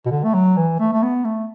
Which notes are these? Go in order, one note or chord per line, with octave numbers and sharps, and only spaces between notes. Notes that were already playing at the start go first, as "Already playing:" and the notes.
B2
D3
A3
F#3
E3
A3
A3
B3
A3